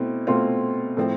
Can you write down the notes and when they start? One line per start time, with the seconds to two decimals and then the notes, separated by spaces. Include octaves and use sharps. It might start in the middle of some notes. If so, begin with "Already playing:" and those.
Already playing: B2 A3 C4 E4
0.27 B2 A3 C4 F4
0.97 A2 F3 C4